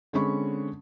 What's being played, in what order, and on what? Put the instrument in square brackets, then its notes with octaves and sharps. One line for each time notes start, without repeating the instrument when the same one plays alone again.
[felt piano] D3 G#3 C4 C#4 B5 C#6